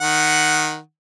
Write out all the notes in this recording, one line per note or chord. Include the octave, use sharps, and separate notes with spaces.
D#3 F#5